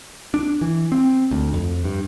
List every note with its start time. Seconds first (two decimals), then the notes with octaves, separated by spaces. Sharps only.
0.34 D4
0.61 E3
0.92 C4
1.31 D2
1.54 F2
1.84 G2